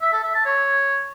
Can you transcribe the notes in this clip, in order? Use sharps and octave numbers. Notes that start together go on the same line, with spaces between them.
E5
A4
E5
A5
C#5